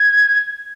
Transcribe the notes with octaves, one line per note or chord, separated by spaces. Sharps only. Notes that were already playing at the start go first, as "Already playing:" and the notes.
Already playing: G#6